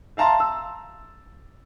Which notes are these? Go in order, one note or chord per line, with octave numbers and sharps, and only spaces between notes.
E5 F5 A5 A#5 C6
E6